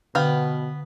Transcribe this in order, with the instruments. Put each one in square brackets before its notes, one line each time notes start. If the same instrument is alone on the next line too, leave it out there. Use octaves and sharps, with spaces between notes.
[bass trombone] B2 [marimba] D3 [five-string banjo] B3 F5 G5